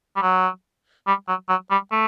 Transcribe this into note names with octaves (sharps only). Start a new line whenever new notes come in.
G3
F#3
G3
F#3
F#3
G3
A3